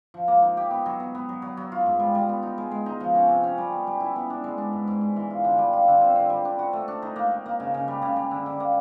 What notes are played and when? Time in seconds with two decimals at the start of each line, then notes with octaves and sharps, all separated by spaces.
0.14 F3
0.28 A#3
0.42 D#4
0.57 G4
0.70 B3
0.86 F#3
1.00 B3
1.15 B3
1.29 F#3
1.42 F#3
1.57 F#3
1.72 F4
1.86 G#2
2.00 G3
2.15 G3
2.29 B3
2.43 D#4
2.58 G#3
2.71 G#3
2.86 D#4
3.00 F3
3.15 C#4
3.29 C3
3.44 C#4
3.58 G3
3.72 B3
3.87 G3
4.00 E4
4.16 B3
4.30 D4
4.44 G#3
4.58 D4
4.73 G#2
4.87 G#2
5.01 G#2
5.16 E3
5.30 F4
5.44 D3
5.58 G3
5.73 F4
5.88 D3
6.01 C4
6.15 C4
6.30 G3
6.45 D4
6.59 F#4
6.73 A3
6.88 D4
7.02 D#4
7.16 A#3
7.31 D#4
7.46 A#3
7.60 C#3
7.74 C#3
7.88 G3
8.02 C#3
8.16 G3
8.31 D3
8.46 D3
8.60 A#3